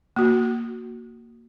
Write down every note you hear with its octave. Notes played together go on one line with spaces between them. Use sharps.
A#3 F#4